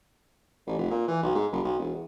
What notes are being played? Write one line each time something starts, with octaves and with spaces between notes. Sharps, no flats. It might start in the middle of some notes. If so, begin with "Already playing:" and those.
A1
F1
A#2
E3
B1
G#2
F#1
B1
E1
E2